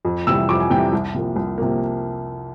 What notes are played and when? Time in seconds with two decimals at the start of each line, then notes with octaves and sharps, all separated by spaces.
0.05 F2
0.27 C3 E3 G3 E6
0.49 F2 D6
0.60 G#5
0.70 C3 E3 G3 G5
0.93 C2
1.14 C3 F3 A#3
1.36 C2
1.58 C3 F3 A#3